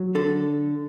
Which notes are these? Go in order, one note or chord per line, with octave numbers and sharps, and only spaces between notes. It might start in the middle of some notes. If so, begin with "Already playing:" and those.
Already playing: F#3
D3 A4